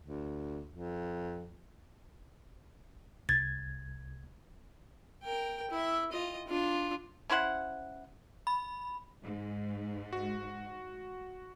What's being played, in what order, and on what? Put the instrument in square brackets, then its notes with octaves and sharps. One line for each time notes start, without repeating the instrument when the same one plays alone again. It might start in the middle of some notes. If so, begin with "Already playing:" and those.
[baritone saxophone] D2
F2
[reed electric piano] C2 G#6 [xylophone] A6
[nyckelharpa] A#4 G5
E4 E5
F4 D#5
D4 F4
[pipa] C#4 E4 C5 F#5
[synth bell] B5
[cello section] G#2
[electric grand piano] F#4